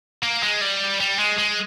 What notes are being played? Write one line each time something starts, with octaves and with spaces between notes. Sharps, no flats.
A#3
G#3
G3
G3
G#3
G#3